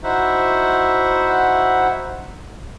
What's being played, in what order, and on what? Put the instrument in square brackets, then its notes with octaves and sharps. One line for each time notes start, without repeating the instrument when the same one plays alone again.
[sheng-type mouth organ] D#4 E4 F#4 C5 E5 F#5